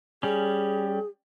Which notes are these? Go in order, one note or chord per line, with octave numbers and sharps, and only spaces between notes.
G3 C#4 G#4